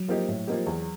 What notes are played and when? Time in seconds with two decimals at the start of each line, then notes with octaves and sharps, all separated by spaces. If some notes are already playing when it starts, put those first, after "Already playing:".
Already playing: F#3
0.08 F3 A#3 D#4 G4
0.28 A2
0.47 F3 A#3 D#4 G4
0.67 E2